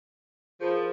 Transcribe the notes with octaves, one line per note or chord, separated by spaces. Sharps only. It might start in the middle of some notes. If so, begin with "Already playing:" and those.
F3 G#4 A#4 B5